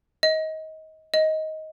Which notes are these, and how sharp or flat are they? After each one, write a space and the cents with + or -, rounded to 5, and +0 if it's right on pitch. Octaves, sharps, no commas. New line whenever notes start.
D#5 +25
D#5 +15